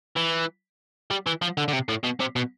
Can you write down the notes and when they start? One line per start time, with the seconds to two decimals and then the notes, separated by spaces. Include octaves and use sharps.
0.16 E3
1.11 G3
1.27 E3
1.42 F3
1.58 D3
1.68 D3
1.73 C3
1.89 A2
2.04 B2
2.20 C3
2.36 B2